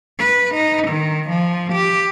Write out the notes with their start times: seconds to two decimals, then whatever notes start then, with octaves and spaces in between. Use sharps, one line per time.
0.20 B4
0.55 D#4
0.88 D#3
1.30 F3
1.73 G4